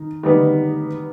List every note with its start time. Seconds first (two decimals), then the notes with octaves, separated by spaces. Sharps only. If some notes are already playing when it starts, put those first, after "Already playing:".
Already playing: D#3
0.23 D#3 G3 B3